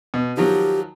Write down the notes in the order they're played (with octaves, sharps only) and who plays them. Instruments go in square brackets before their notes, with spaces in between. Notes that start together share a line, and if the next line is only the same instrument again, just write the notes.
[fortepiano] B2
[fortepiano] D#3 F3 F#3 [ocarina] G4